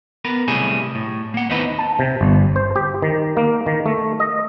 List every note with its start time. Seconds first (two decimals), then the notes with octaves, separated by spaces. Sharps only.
0.25 B3 A#4 B4
0.48 B1 C3 G3 A3 E4 G#4
0.95 A2
1.34 A#3 F#5
1.49 D#2 B3 C4 D#4 E4 B4
1.79 A5
1.99 C3
2.21 G1
2.56 C5
2.76 G4
3.02 D#3
3.37 A#3
3.66 D#3
3.86 A3
4.20 D#5